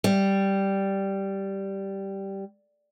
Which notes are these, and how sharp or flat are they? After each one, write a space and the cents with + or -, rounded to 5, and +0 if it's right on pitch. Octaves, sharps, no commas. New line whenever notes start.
G3 -5